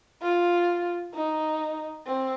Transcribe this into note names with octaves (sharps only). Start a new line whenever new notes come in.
F4
D#4
C4